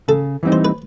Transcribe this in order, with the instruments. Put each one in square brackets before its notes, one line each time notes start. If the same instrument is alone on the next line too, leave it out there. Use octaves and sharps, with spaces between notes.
[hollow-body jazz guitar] C#3 [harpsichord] A4
[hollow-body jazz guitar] E3 G3 C4 D#4
[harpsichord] C5
B4